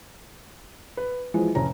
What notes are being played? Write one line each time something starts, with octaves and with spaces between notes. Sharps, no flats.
B4
E3 F3 G#3
F1 C#4 A#5